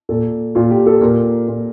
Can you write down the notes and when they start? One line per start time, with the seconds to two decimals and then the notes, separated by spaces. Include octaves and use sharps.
0.09 A#2 A4
0.55 A#2 F4
0.71 G4
0.86 A4
1.01 A#2 A#4
1.48 A#2